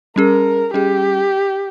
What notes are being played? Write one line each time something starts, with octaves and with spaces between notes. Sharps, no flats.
G3 C#4 G#4 A#4
G3 C#4 G4 G#4